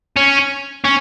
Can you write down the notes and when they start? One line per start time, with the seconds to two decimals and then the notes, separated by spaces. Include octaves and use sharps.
0.17 C#4
0.85 C#4